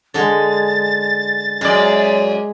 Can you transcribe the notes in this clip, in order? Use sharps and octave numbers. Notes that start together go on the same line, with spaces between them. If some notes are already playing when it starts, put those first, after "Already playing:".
D3 G#3 A6
F#2 G#3 D5